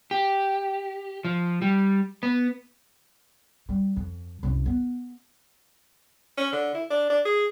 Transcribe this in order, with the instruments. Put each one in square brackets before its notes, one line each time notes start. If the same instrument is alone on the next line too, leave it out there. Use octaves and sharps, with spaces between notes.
[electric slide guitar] G4
F3
G3
B3
[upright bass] G3
F2
C2 F#2
B3
[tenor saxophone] C#4
D3
E4
D4
D4
G#4